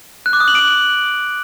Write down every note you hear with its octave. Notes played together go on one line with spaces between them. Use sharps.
F#6
D6
D#6
F#7
D7